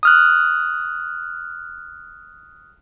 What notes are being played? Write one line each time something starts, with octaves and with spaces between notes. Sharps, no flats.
D#6 F6 F#6